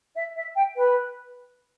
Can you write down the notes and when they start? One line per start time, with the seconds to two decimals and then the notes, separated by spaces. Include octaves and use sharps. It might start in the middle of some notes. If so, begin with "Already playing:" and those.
0.15 E5
0.36 E5
0.56 G5
0.76 B4